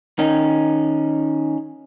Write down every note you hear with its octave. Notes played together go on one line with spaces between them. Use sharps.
D#3 C#4 D#4